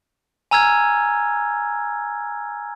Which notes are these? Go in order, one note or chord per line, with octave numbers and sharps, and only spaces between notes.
G#5 A#5 E6 F6 G#6